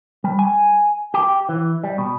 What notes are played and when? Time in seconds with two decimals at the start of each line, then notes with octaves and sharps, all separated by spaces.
0.24 G3
0.39 G#5
1.14 G4
1.49 E3
1.84 G3
1.98 B2